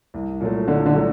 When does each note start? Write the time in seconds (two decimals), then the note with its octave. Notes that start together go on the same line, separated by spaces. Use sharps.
0.14 C2
0.40 A#2 F#3 A3
0.67 C2 D3
0.86 D3
0.94 A#2 F#3 A3